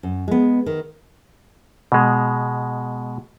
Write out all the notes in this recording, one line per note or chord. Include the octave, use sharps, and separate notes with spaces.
F#2
G#3 B3
D#3
B2 G#3